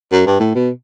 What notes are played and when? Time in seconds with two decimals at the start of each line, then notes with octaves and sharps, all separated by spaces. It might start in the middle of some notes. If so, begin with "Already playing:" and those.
0.12 F#2
0.26 G2
0.40 A2
0.55 B2